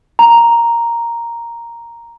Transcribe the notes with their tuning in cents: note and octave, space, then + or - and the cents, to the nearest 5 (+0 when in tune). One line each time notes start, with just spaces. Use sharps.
A#5 +0